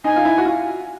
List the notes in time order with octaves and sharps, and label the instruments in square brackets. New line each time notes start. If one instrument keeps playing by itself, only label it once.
[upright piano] D#4 [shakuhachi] G#5
[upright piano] F4
E4
F#4
F4